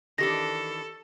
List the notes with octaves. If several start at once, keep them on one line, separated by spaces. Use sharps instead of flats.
D#3 E3 D4 G4 A4 A#6